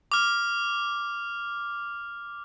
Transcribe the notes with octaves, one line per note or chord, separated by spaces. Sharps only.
D6 F6